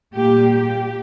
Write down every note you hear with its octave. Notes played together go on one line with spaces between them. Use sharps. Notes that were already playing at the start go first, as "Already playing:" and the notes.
A#2 G3 A#3 G4
G4